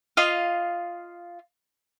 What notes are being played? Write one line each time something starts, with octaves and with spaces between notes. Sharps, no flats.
F4 D#5 F5